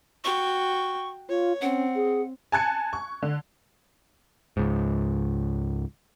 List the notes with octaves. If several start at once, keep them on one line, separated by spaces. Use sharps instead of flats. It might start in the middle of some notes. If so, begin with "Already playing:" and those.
F#4 G5 C#6
F4 C#5
C4 C#4 F#5
G#4
G#5 A5 F#6 G#6 C#7
C#6
D3
C#2 G#2